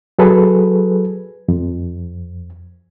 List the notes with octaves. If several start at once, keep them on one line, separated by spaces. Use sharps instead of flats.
F#3 G#4 A4 B4
F2